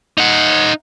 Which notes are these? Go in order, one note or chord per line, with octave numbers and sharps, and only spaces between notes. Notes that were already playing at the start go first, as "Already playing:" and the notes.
D#4 F#5